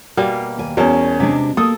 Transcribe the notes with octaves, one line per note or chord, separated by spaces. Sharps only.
B2 G3 A#3 D5 F5 G#5
D#2 G#5
E2 B2 C#4 A#4 A5
C3 G#3 D4
A#3 A4 D#6